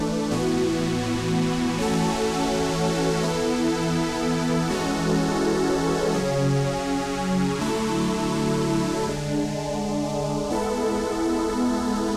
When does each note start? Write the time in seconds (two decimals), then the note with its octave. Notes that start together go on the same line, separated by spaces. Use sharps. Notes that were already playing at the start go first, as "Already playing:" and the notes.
Already playing: E3 A3 D4
0.31 A2 E3 B3 F#4
1.77 E3 A3 C#4 F#4 A4
3.22 E3 B3 E4 A4
4.68 E3 G#3 C#4 F#4 A4
6.14 C#3 F#3 C#4 G#4
7.58 D3 F#3 A3 E4 A4
9.04 D3 G#3 D4
10.50 G#3 B3 E4 A4